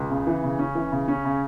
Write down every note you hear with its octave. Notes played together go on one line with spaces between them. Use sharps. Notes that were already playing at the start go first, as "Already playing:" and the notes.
Already playing: C#2
C#3
E3
C#3
C#4
E3
C#3
C#4
C#3